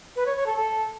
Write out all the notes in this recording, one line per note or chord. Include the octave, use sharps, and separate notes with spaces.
B4
C#5
C#5
A4
A4